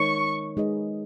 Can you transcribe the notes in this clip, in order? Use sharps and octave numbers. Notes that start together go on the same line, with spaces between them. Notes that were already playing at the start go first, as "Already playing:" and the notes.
Already playing: D#3 G#3 D#4 A#4 C#5 C#6
G#3 D#4 G#4 B4 D#5